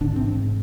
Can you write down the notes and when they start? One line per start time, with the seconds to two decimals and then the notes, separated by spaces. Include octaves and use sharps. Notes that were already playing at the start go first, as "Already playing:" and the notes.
0.01 A1 G#2 D3 D4
0.16 C3 C4